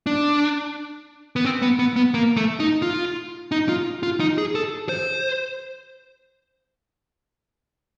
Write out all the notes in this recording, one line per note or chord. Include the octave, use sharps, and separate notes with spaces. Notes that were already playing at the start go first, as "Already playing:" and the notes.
D4
B3
C4
B3
B3
B3
A#3
A3
D#4
F4
D#4
F4
F4
D#4
G#4
A4
C5